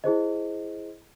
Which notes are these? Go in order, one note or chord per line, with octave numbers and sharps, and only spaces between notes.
E4 G#4 C5 D#5